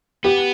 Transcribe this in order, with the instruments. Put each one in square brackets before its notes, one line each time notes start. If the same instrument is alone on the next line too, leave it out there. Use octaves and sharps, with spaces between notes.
[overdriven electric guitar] B3 [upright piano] G4